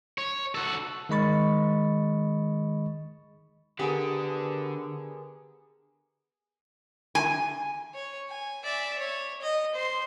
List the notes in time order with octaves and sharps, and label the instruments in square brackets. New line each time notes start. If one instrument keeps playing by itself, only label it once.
[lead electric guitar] C#5
F#4 A4
[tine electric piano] D#3 G#3 D#5 B5 C#6 A6
[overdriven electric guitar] D3 [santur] B3 G#4 A#4 [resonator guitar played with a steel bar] G4
[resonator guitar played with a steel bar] G#5
[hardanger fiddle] C#5
G#5
D5 E5
C#5
D#5
C5 C6